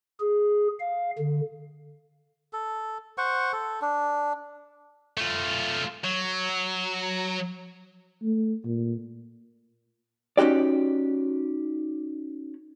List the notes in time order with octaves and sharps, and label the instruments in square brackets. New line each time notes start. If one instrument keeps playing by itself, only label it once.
[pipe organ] G#4
F5
D3
[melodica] A4
C5 F#5 C#6
A4
D4
[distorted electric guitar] A3 F4
F#3
[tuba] A3
A#2
[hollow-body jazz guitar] C#4 D#4 F#4 G4 D5